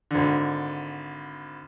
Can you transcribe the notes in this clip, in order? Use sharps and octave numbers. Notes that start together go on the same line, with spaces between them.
G#1 D3